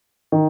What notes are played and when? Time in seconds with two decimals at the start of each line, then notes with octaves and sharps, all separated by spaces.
0.32 D#3